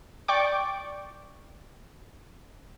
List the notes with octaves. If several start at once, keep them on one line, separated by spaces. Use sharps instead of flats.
D5 G5 C#6 D6